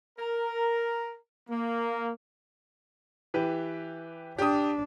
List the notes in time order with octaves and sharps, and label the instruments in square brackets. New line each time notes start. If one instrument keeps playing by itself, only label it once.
[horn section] A#4
A#3
[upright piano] E3 G4 B4
[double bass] D4 [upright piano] G4 D#6